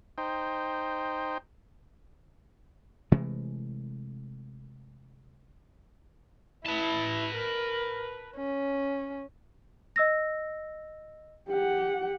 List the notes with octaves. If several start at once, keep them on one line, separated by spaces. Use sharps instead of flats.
D#4 C5 G5
C3 E3 G#3 A3
E4 B4 A5
A#4
C#4
D#5 E6 A#6
G4 F#5